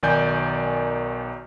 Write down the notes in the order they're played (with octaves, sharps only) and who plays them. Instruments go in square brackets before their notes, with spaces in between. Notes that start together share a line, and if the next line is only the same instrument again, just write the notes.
[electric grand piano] B1 D#3 D5 G#5 G6